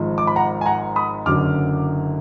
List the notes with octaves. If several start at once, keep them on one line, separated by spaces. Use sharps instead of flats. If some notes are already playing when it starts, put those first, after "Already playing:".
Already playing: G#1 G#2 F3
D6
B5
F#5 A#5
G#5
F#5 A#5
B5 D#6
F#1 F#2 D3 F#3 D6 F6